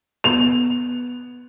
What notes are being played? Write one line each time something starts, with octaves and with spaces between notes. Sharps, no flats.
B3 F7